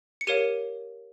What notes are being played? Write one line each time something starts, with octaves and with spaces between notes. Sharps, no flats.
C#7
G4 A#4 C#5 F5 D#7